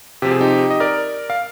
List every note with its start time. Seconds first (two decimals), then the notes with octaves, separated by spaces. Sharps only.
0.22 C3 F3 C4 G4
0.31 G#4
0.41 D#4 G4
0.70 D#5
0.80 A#4 D5
1.30 F5